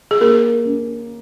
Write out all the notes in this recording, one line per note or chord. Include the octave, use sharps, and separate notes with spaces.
G#4
A#3 A#4
C#4